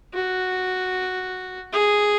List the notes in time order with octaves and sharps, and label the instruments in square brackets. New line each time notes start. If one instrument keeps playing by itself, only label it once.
[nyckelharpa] F#4
G#4